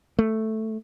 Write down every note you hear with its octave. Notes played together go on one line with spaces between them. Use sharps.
A3